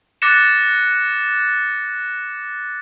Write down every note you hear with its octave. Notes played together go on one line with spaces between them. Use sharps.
D6 F#6 A6 A#6 C#7 E7